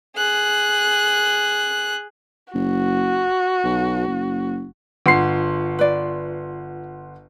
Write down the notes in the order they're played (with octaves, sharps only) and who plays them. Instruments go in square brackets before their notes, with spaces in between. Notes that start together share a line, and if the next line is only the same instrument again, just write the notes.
[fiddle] G#4 F#6
[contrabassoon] F#1 [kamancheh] F#4
[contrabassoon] B1
F#1
[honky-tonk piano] G1 [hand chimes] F4 [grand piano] F#5 C6 C7
[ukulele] B4 D5